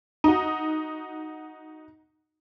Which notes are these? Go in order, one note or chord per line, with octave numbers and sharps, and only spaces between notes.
D#4 F#4